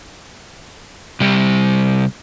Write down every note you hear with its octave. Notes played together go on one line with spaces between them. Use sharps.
C3 G3